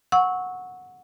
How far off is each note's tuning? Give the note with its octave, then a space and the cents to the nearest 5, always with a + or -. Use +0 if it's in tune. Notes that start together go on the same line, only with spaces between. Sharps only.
F#5 -15 C#6 +0 E6 -20